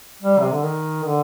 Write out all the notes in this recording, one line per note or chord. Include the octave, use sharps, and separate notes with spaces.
G3
C3
D3
D#3
D3